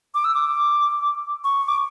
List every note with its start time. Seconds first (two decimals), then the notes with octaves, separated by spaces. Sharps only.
0.15 D6
0.24 E6
0.34 D6
1.44 C#6
1.68 D6